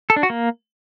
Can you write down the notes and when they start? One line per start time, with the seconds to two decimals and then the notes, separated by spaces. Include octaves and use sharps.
0.10 A4
0.16 D4
0.23 F#4
0.30 A#3